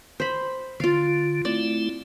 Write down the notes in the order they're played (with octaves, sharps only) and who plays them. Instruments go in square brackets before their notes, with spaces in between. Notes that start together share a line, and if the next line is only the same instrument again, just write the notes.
[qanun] C5 B5
[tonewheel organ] D3 [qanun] F4 F5
[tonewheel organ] A3 C4 E4 [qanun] D5